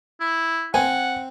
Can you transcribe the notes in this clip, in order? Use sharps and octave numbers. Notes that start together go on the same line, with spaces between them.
E4
C4 F#5 G#5